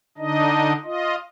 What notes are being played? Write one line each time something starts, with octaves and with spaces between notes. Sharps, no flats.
D3 D4 D#4 D#5
F4 D#5